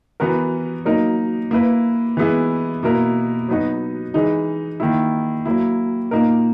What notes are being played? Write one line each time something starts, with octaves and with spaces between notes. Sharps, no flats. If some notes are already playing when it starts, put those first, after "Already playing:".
E3 B3 F#4 A#4
F#3 A#3 D#4 A#4
A#3 E4 B4
E3 G#3 B3 E4
B2 A#3 E4 A#4
F#3 B3 D#4 F#4
E3 G#3 D#4
D#3 A#3 E4
F#3 A#3 E4
A#2 A#3 D#4 A#4